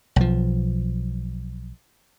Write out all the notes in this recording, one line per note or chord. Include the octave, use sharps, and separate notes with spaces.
B1 F3